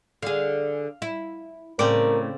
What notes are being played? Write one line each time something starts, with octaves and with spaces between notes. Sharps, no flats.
D3 G#4 F5
E4
A2 C#3 C4 A#4 D5